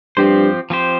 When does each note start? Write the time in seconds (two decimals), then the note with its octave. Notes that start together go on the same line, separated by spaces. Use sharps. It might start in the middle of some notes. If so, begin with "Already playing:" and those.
0.17 G2 F3 C4 G4 C5
0.70 F3 C4 G4 C5